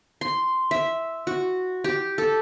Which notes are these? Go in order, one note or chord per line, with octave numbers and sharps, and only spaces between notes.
C6
E5
F#4
G4
A4